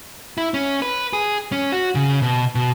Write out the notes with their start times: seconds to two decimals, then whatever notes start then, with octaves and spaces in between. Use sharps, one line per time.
0.38 E4
0.54 C#4
0.82 B4
1.13 G#4
1.52 C#4
1.72 F#4
1.95 C#3
2.22 B2
2.55 B2